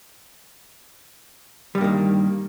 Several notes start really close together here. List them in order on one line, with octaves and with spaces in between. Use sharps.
G3 G2 A#3 D#3